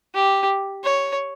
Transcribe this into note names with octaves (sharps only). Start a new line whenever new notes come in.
G4
C#5